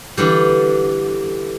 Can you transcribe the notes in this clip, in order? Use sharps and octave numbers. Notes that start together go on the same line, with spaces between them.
D3 E3 G3